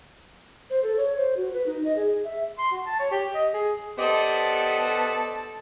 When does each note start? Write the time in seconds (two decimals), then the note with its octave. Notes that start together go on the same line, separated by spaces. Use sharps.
0.70 C5
0.83 A4
0.97 C#5
1.17 C5
1.37 F#4
1.53 B4
1.66 D#4
1.85 D#5
1.96 G#4
2.24 E5
2.58 C6
2.71 F#4
2.86 A5
3.00 C#5
3.11 G4
3.35 D#5
3.54 G#4
3.98 B3 G4 A4 C5 D5 D#5